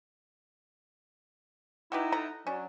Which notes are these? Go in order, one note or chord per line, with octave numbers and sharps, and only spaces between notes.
D#4 E4 F#4 G4 B4
A4 F#5 A#5
F#3 C#4 D4